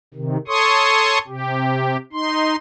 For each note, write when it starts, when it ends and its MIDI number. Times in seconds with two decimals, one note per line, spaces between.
0.14 0.37 48
0.14 0.37 51
0.48 1.18 69
0.48 1.18 73
0.48 1.18 84
0.48 1.18 85
0.48 1.18 87
1.28 1.97 48
1.28 1.97 67
2.13 2.56 63
2.13 2.56 84